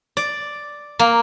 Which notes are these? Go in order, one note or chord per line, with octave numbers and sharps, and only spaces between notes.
D5
A#3